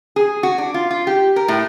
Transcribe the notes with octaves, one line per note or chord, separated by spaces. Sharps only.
G#4
F#4
D4
F4
F4
G4
A#4
A2